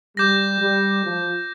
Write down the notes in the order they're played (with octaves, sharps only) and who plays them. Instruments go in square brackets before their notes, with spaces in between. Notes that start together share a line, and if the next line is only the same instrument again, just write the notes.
[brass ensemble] G3 [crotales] D6 G6 A#6
[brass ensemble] G3
F3